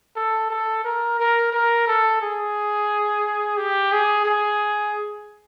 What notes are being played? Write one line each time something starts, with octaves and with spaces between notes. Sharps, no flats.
A4
A4
A#4
A#4
A#4
A4
G#4
G4
G#4
G#4